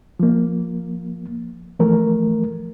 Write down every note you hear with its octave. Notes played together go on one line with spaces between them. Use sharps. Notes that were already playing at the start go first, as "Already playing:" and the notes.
F3 A#3
E3 F3 A3 A#4